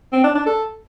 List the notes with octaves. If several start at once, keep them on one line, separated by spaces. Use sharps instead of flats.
C4
D4
D4
A4